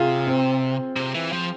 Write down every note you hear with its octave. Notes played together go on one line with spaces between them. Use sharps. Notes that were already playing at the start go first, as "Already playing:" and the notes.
Already playing: C3 F4 G#4
C4
C3
E3
F3